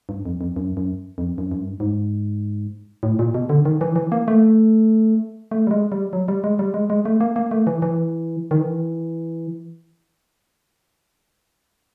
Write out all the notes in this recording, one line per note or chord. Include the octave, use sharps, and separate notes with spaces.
G2
F2
F2
F#2
F#2
F2
F#2
F#2
G2
G#2
A2
A#2
B2
D3
D#3
E3
E3
A#3
A3
A3
G3
G#3
G3
F#3
G3
G#3
G3
G#3
G#3
A3
A#3
A#3
A3
E3
E3
D#3
E3